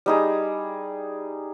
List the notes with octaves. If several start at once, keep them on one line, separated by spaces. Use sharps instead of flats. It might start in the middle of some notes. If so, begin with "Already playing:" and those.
G3 D#4 G#4